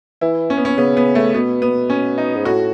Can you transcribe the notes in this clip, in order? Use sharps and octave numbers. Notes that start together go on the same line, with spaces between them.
E3 E4
C#4
B3
C#4
C#3 B3
B3
A3
B2 B3
B3
C#4
D#4
G#2
A2 F#4